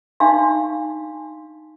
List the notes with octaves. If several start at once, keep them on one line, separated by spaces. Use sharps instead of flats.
D4 D#4 F5 C6